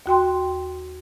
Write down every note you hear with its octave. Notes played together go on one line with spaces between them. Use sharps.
D#2 F#4 G5 C6